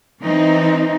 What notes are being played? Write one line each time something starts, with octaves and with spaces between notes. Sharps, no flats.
E3 C4 D#4